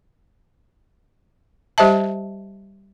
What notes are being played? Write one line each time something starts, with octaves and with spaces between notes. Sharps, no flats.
G3 G4 C5 D#5 E5 A5